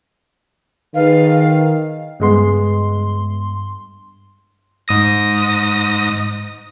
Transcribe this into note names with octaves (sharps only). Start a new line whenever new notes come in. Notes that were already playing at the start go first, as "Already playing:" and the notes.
D#3 G#4 B4 F5
C#2 G2 G#3 B3 C6
G#2 D#6 A#6